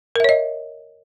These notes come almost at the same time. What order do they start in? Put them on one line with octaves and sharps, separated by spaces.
A#4 E5 C#5 D#5